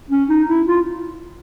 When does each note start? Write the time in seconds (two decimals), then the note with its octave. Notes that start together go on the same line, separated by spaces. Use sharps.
0.11 C#4
0.29 D#4
0.48 E4
0.67 F4